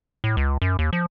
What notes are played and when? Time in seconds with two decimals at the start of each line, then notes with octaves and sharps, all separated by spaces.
0.24 A2
0.37 C#2
0.62 F#2
0.79 D#2
0.93 F3